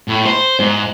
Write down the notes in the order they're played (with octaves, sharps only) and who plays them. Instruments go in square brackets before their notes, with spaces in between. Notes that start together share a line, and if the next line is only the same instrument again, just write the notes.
[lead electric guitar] A2
C5
G#2